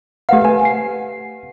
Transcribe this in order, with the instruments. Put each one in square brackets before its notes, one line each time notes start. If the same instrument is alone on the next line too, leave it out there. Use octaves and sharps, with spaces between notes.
[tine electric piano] A3 F5 [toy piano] G4 B4 F#5
[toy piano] B4 [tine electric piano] G#5
[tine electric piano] C7